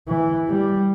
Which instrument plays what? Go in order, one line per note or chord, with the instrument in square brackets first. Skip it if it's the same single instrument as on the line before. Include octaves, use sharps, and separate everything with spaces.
[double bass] E3
G3